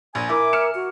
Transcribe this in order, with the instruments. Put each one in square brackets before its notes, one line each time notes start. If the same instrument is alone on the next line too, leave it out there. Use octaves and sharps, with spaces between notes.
[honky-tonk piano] A#1 [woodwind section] G#5
[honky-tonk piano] E4 [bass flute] A#4 [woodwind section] E5 G#5 D6
[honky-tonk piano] F6 C#7 E7
[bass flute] F#4